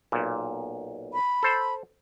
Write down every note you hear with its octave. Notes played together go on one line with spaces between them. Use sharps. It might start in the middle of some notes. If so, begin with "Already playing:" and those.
B1 A#2
B5
A4 C5